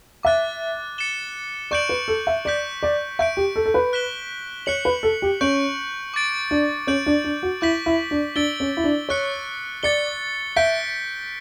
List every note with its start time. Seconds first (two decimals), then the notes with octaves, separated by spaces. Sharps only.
0.23 E5 D6 F#6 A6
0.98 A6 C#7 E7 G7
1.71 D5 C#6 G6 D7 F#7
1.89 B4
2.08 A4
2.27 E5
2.45 D5 G6 B6 D7
2.83 D5
3.19 E5 C#6 G6 D7
3.37 G4
3.56 A4
3.66 A4
3.74 B4
3.93 F#6 B6 E7 G7
4.66 C#5 F#6 C#7 F#7
4.85 B4
5.03 A4
5.22 G4
5.41 C#4 C#6 G6 D7 F#7
6.14 D6 A6 D7
6.51 D4
6.87 C#4 G6 D7 F#7
7.06 D4
7.24 D4
7.43 F#4
7.61 E4 D6 G6 B6 F#7
7.86 E4
8.11 D4
8.36 D4 E6 A6 D7 G7
8.60 C#4
8.77 E4
8.84 D4
9.09 C#5 C#6 F#6 C#7
9.83 D5 A6 C#7 G7
10.56 E5 G6 B6 D7